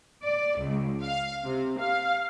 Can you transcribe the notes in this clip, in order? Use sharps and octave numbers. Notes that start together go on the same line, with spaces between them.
D5
C#2
F5
C3
F5